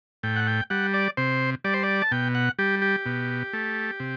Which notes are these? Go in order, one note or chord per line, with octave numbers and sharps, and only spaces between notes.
A2 G5
F#5
G5
G3 F#5
D5
C3 C5
G3 D5
C5
D5
A5
B2 G5
F#5
G3 G4
G4
B2
A3
C3